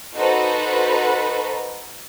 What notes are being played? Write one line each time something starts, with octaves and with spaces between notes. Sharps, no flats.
D#4 F#4 A4 B4 C5